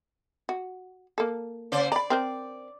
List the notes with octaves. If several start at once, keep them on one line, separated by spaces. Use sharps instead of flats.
F#4
A#3 A4
C#3 C5 D5
D5 A#5 B5
C4 A#4 C5